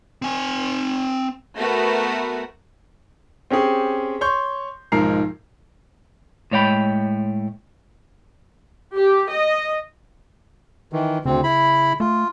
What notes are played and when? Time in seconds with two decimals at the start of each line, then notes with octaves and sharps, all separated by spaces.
0.22 C4 G#5
1.57 A3 B3 F#4 A#4
3.50 C4 C#4 G4 G#4
4.21 C#5 C6 C#6 G6
4.92 B1 G#2 F3 A#4 A#5 C7
6.51 A2 G#3 C#5 D5 G5 B5
8.95 G4
9.31 D#5
10.93 D#3 E3
11.25 D2 C#3 C4
11.43 E4 B5
12.00 A3 F4